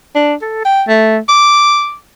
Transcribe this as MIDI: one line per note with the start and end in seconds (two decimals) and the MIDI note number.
0.15 0.34 62
0.42 0.61 69
0.65 0.83 79
0.88 1.17 57
1.29 1.95 86